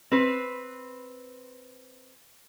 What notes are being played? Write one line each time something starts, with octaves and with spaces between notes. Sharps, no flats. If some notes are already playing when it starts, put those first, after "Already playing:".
C4 B4